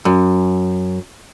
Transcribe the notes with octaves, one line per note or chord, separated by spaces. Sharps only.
F#2